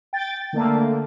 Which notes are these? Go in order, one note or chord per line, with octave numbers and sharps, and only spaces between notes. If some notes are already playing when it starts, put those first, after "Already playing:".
G5 A6
D3 A3 A#3